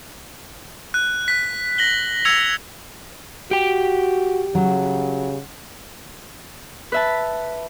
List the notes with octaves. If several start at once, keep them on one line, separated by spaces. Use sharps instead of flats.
F#6
F#6 B6
A#6 F#7 G7
E6 G#6 C#7 F7
F#4 G4 G5
C#3 F#3
B4 E5 A5